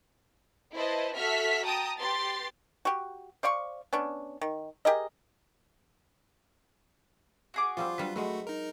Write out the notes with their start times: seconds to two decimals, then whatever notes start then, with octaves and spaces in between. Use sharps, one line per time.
0.75 E4 B4 C5 D#5 A5
1.16 F#4 A4 E5 F6 B6
1.65 G5 A5 A#5 D#6
1.98 G4 B4 C6 A6
2.85 F#4 G4
3.43 C5 D5 F5 C#6
3.93 B3 C#4 D4
4.41 D#3
4.85 G4 G#4 A#4 D#5
7.54 F#4 G#4 D6
7.77 F3 G3 C4 F4
7.98 F#3 G3 D4 B4
8.16 F#3 G#3 A3 F#4
8.47 D#4 A#4